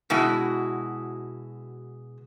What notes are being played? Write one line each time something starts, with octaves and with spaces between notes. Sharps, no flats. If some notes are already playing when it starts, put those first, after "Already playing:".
B2 G#3 E4 F#4